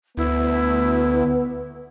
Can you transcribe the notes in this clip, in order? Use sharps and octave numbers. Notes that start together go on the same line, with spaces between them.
D2 B3 E4